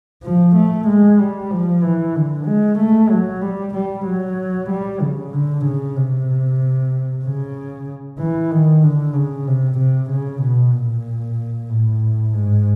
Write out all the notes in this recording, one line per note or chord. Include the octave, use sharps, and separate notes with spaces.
F3
A3
G#3
G3
F3
E3
D3
G#3
A3
F#3
G3
G3
F#3
G3
C#3
D3
C#3
C3
C#3
E3
D#3
D3
C#3
C3
C3
C#3
B2
A#2
A2
G#2